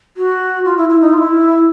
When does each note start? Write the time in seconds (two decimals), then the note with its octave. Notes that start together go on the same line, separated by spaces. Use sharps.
0.17 F#4
0.64 F4
0.77 E4
0.89 E4
1.01 D#4
1.13 F4
1.18 E4